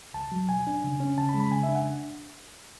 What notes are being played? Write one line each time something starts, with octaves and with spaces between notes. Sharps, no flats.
C#2 A5
F#3
B2 G#5
D4
C#3
C#4
C#3 A5
B5
G#3
B5
C#3 G#5
E5
D4
F#5